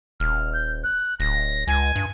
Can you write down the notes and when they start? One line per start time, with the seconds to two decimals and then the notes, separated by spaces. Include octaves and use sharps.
0.20 D#1 F6
0.53 G6
0.84 F#6
1.20 D1 A#6
1.67 C#2 G#5
1.96 G2